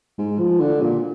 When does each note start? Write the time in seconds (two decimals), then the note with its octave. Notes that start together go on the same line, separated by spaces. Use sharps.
0.18 G#2
0.39 F3
0.60 D3
0.81 A#2